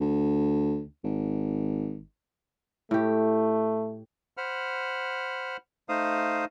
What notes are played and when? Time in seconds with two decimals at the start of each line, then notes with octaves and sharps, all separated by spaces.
0.01 D2
1.04 G#1
2.91 A2 A3 G4
4.37 C5 F#5 B5 F6
5.89 A3 D#4 C5 F5 D#6